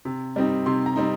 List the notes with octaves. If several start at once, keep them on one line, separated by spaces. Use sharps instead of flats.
C3
G3 C4 D#4
C3 C6
A#5
G3 C4 D#4